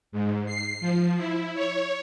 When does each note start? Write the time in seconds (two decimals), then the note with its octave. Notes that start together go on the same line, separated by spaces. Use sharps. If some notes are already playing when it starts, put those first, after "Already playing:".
0.12 G#2
0.46 C7
0.81 F3
1.17 E4
1.55 C#5